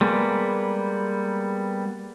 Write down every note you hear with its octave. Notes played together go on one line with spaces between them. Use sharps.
G3 G#3 A#3 B3